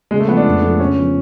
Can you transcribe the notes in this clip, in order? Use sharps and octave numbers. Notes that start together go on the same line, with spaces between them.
C#3 G#3
A3
F3 G#3 B3
D4
F2
F3 A3 D4
C#3 C#4
F3 B3